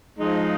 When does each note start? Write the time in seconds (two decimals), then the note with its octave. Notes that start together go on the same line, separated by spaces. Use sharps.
0.18 F3 G#3 D#4